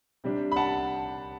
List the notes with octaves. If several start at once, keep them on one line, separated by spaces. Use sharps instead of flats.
C3 G3 D4
B5
F#5 A5